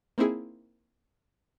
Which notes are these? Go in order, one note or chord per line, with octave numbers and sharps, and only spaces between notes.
A#3 C4 D#4 E4 G#4